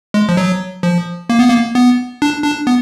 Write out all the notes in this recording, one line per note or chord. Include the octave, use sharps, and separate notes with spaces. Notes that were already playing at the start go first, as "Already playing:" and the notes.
G#3
F3
F#3
F3
A#3
B3
A#3
B3
D4
D4
B3